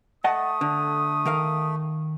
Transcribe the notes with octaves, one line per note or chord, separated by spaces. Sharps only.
A3 D#5 F#5 A5 D#6
D3
D#3 A#4 F5